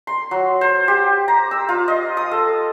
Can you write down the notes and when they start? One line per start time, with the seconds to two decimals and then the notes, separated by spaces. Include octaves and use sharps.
0.07 C6
0.31 F#3
0.61 C5
0.88 G4
1.28 A#5
1.51 E6
1.69 F4
1.88 D#5
2.17 D#6
2.31 A4